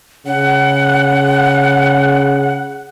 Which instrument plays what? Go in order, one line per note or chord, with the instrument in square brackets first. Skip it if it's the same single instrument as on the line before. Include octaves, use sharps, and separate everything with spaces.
[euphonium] C#3 [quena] F#5